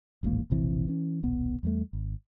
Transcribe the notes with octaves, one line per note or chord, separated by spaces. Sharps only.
D#1 A1 G#2 A#3
E1 A#1 C3 E3
E3 C#4
D#1 B1 B3
E2 G3 A3
G#1